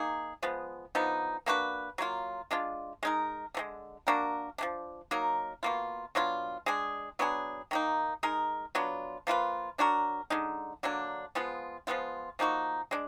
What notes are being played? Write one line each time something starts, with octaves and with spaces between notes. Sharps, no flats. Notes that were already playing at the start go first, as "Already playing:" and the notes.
Already playing: A#3 D#4 G#4
F3 G#3 B3
D3 F3 B3 D#4
A#3 D4 F#4 B4
F#3 A#3 F4
G#3 D4 F4
G#3 D#4 A#4
D3 F3 G#3
A#3 D4 F#4 A#4
F3 G#3 D4
F#3 A#3 D#4 A#4
B2 A#3 F4
B2 F#3 D4 F4
G#3 D4 G#4
F#3 B3 D4 G#4
D#3 A#3 D#4
G#3 D#4 A#4
F#3 B3 D4 F4
F3 A#3 F4 B4
F#3 D4 F#4 A#4
D3 G#3 D#4
D3 F#3 A#3 D4
F3 G#3 B3 F4
F3 G#3 B3 F4
F3 A#3 D#4 F#4
G#3 D4